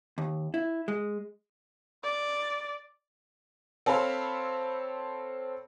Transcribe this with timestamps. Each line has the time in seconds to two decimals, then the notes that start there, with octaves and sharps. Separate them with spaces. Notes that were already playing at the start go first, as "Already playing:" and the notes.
0.18 D#2
0.54 E4
0.88 G#3
2.04 D5
3.86 C4 A4 C#5 F5 B5 C6